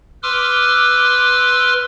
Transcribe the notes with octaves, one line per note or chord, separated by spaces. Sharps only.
B4 C6 D6 E6 F6